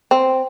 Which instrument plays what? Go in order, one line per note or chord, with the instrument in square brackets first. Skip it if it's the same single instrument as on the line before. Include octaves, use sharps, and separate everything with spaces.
[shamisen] C4